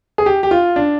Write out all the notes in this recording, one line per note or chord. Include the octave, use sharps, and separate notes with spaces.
G#4
G4
G4
F4
D4